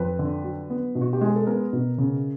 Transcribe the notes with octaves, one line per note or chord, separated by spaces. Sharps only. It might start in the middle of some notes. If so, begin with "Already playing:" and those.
Already playing: F2 B4
D3
F#3
B3
B2
F#4
G4
G#3 G#4
A4
B3 A#4
B2
C#3